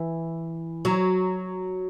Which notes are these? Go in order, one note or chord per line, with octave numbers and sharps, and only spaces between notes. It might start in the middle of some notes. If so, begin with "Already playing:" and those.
Already playing: E3
F#3